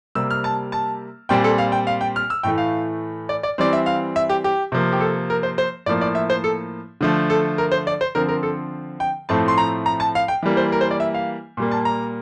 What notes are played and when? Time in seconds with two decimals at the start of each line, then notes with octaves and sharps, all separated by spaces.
0.15 C3 G3 A#3 E6
0.30 F6
0.44 A5
0.72 A5
1.29 A#2 G3 C4 G5
1.44 A4
1.58 F5
1.72 G5
1.87 F5
2.01 G5
2.16 F6
2.30 E6
2.43 A2 E3 A3 G5
2.58 F5
3.29 D5
3.43 D5
3.58 E3 G3 C4 D5
3.73 E5
3.86 F5
4.16 E5
4.29 G4
4.44 G4
4.72 C3 F3 A#3
4.93 G4
5.01 A4
5.30 A#4
5.43 C5
5.58 C5
5.86 A2 F3 A#3 D5
6.01 D5
6.15 E5
6.30 C5
6.44 A4
7.01 D3 F3 A3
7.30 A4
7.58 A#4
7.72 C5
7.87 D5
8.01 C5
8.15 D3 F3 C4 A#4
8.29 A#4
8.43 A4
9.00 G5
9.29 A2 F3 A3 C4 A5
9.48 C6
9.58 A#5
9.86 A#5
10.00 A5
10.15 F5
10.28 G5
10.43 E3 G3 A#3
10.57 C5
10.72 A#4
10.81 C5
10.91 D5
11.00 E5
11.14 F5
11.57 A#2 G3 A#3
11.71 A5
11.85 A#5